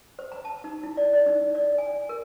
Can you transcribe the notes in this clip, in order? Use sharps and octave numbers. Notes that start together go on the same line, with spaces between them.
C5
A#5
A5
D#4
E4
D5
D5
D#4
D5
G#5
A#4